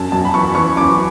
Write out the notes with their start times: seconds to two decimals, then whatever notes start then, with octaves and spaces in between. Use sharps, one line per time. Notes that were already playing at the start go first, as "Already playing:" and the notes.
Already playing: F#2 A5
0.12 F#2 A5
0.25 B5
0.34 E3 C#6
0.55 E3 C#6
0.77 F#2 D6